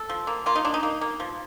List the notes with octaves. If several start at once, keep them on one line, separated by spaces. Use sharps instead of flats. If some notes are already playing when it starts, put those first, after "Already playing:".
Already playing: A4
F3
A#3
A#3 F4
D#4
A#3 D4
D#4
A#3
A#3
F3